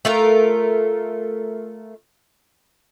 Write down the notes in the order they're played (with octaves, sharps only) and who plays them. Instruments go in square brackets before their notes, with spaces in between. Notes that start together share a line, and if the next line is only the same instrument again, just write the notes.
[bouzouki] A3 F4 A#4